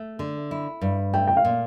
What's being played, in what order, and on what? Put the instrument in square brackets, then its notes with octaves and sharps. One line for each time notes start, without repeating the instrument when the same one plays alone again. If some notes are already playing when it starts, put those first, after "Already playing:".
Already playing: [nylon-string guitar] A3
D3
E4
G2
[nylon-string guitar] A3 [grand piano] G5
[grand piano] G5
F5
[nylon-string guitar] A#2